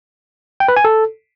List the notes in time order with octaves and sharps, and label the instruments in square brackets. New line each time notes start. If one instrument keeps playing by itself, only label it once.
[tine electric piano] G5
B4
G#5
A4